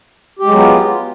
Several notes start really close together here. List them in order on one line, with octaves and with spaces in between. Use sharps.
G4 G#3 F#3 B3 F4